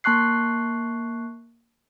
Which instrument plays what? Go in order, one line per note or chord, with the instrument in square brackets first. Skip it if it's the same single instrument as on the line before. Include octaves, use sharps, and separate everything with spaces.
[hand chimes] A#3 A5 C#6 F#6 C7